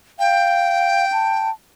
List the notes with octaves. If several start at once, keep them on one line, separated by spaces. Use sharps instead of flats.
F5 G5
A5